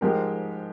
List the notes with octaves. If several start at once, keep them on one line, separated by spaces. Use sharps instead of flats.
G#2 F3 G#3 G4 A#4